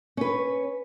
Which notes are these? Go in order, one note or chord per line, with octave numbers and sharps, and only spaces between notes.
C#4 B4